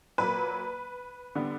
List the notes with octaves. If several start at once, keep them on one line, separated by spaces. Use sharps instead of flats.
A#2 F#3 A#3 B4
D3 G3 B3